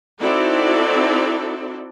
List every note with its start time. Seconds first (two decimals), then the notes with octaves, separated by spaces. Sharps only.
0.20 C4 D#4 E4 F#4 A4 D5